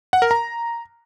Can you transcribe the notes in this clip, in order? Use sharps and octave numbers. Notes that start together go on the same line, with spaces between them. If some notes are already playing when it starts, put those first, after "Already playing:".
F#5
A#4
A#5